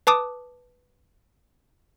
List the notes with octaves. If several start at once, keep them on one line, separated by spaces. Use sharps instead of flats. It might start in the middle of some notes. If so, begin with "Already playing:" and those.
B4 A5 D6 D#6